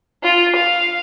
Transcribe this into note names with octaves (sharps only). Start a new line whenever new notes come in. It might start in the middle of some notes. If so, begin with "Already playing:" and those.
F4
F5